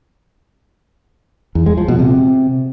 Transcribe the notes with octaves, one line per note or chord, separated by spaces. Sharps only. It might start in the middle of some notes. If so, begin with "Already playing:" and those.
E2
G#3
F3
B2
C3